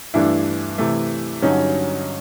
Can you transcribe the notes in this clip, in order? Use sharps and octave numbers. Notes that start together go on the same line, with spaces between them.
G2 E3 A3 D4 E4
C3 E3 A3
G2 D3 F#3 C#4 D#4